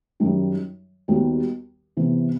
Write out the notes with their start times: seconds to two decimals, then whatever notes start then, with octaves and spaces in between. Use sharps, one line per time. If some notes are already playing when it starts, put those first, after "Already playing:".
0.20 F#2 D#3 G3
1.08 D#2 D#3 G3 B3 F#4
1.97 C3 E3 B3